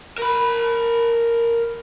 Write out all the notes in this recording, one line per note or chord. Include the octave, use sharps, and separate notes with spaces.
A#4 B5